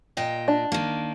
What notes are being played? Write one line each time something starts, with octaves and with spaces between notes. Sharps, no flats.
A#2 D#5 G5
D4
D#3 A#3